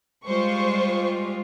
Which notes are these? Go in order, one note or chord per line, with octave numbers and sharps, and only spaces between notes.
G3 G#3 F4 C5 C#6